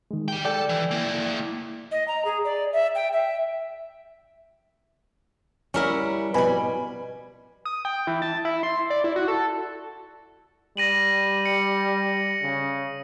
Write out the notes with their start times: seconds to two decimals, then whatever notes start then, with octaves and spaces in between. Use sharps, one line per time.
0.11 D#3 G#3
0.28 G3 G5
0.45 A4 D5 G5
0.69 E3
0.91 A#3 E4
1.92 D#5
2.08 A#5
2.25 G#4
2.44 D5
2.73 E5
2.95 G5
3.13 E5
5.74 G3 C#4 E4 A#4 F#5
6.34 B2 G3 B4 G#5 B5
7.65 D#6
7.85 G5
8.07 E3
8.22 A5
8.45 E4
8.63 C6
8.90 D5
9.04 E4
9.16 F#4
9.28 A4
10.77 G3 A#6 D#7 F#7
11.46 C#7
12.42 C#3